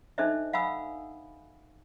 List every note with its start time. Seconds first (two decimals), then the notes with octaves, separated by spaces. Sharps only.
0.18 D4 D#4 A4 C5 D#5 E5
0.53 F5 F#5 G#5 B5 D#6 E6